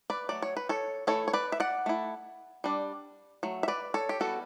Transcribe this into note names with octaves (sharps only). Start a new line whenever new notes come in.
B4 D5
F#3 A3 D5
C#5
B4
A4 C#5
E3 A3 E4 A4 C#5
C#5
B4 D5
E5
D5 F#5
A3 E4
G3 D4
F#3 A3
E5
B4 D5
A4 C#5
G4
E3 G3 B3 F#4 A4